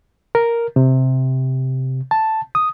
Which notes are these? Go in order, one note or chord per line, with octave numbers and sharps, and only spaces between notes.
A#4
C3
A5
D#6